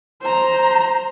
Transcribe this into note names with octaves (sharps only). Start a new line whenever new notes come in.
C5 A#5